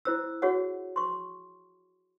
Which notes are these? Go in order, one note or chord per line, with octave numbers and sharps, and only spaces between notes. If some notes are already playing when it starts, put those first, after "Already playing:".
E4 C5 E6
F#4 G#4 C#5 F#5
C6 C#6